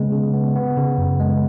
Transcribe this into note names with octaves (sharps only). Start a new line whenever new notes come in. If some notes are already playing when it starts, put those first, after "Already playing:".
Already playing: C#3 G#3 B3
C#3
B3
B3
C#3
F#2
G#3